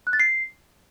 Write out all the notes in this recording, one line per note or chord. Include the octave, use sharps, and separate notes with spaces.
F#6
A6
C7